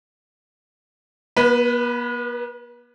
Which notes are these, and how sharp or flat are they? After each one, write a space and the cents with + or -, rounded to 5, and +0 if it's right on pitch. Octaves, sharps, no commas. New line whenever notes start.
B3 -45 B4 +0